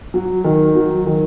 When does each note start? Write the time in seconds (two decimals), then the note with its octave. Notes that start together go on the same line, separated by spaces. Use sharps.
0.14 F#3
0.44 D#3
0.75 F#3
1.06 D#3